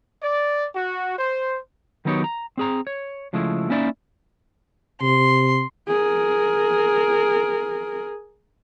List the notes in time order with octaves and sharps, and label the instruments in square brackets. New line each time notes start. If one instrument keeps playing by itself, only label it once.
[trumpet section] D5
F#4
C5
[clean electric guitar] D#3 F#3 B3 D#4 G4 C#5
A#5
C4 G#4 A#5
C#5
C#3 F3 G#3 A3 E4
A#3 C#4 D#4 E4 D5 E5
[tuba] C3 [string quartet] C6
[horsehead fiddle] G#4 A#4